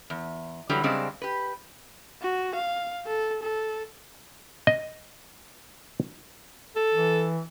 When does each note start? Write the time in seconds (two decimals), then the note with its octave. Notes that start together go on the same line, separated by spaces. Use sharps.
0.10 E2
0.69 D3 E3 F#3 G3
0.84 C#3 G3 G#3 C4 D4
1.22 G4 B4
2.22 F#4
2.56 F5
3.07 A4
3.43 A4
4.67 D#5
6.76 A4
6.94 E3